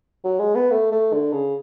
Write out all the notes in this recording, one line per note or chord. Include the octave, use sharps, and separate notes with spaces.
F#3
G#3
B3
A3
A3
D3
C#3